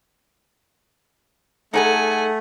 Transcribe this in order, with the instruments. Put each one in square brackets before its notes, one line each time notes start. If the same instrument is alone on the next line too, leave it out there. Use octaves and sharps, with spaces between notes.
[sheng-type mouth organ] A3 [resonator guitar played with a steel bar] D#4 G#4 A4 [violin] F#5 G#5